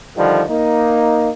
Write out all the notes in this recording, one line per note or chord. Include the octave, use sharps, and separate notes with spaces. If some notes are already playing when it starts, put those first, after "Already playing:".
D3 D#3 F3 G3
A#3 D#4